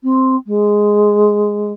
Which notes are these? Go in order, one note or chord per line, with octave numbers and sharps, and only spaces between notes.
C4
G#3